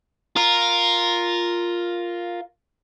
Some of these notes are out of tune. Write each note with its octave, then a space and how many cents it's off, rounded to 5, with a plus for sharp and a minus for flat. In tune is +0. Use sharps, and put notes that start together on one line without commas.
F4 +0 A#4 +0